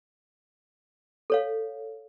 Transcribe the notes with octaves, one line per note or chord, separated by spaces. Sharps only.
A4 C#5 F5